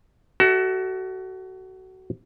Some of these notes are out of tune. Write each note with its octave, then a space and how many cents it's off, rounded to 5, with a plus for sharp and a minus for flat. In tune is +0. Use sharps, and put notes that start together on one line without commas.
F#4 +25 A4 +0 E5 -10